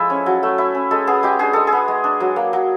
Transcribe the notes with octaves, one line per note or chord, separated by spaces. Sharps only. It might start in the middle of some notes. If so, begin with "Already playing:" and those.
Already playing: F3 G#3 E4 A4
C#4
F#3
A3
E4
C#4
G#3 A4
B3 G#4
G#3 G4
D4 G#4
G#3 A4
G#4
B3
G#3
D4
F#3
A#3
F#3